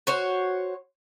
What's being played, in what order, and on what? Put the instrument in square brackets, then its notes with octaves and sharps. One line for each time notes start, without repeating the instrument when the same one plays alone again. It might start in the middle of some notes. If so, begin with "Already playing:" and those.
[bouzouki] F#4 C5 C#5